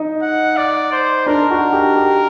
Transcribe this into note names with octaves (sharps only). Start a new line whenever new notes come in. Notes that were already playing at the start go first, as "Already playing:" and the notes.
Already playing: D#4
F#5
D5
C5
D4 A#4
F#4
G4
G4